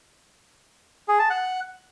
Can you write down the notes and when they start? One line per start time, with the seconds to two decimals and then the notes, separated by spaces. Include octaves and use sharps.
1.08 G#4
1.19 A5
1.30 F#5